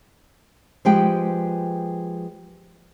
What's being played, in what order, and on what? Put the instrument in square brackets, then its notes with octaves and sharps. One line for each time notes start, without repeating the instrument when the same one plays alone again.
[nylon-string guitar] F3 G#3 G4 B4 G5